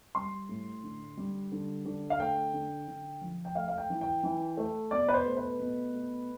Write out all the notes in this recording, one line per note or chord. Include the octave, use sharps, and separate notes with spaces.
G3 C6
A2
D3
G3
D3
D3
F5
A3 G5
D3
D3
F3
G5
A3 F5
F5
G5
E3
G5
E3
A3
B2 D5
B4
C5
A3
B4
B2
A3